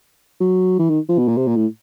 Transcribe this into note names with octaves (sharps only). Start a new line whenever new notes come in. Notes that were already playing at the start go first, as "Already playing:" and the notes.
F#3
E3
D#3
F3
B2
A#2
C3
A#2
A2